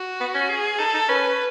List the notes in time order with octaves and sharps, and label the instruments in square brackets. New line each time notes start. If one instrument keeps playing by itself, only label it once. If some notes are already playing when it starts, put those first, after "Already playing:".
Already playing: [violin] F#4
[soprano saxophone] B3
C#4
[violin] G#4
[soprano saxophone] D#4 [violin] A4
[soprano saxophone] D#4
[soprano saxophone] C#4 [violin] B4